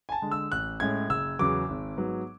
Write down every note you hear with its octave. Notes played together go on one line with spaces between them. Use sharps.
G#5
A5
D3 G#3
E6
A1 F#6
A2 G#3 C#4 G#6
F#1 E6
E2 C#3 F#3 B3 D6
G#1
G#2 F#3 B3